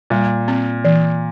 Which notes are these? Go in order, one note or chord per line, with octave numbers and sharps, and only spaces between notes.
A#2 G3
C4
E3